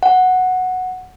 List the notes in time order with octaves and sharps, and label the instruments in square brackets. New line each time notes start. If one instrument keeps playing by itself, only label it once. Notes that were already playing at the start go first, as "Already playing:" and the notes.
[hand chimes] F#5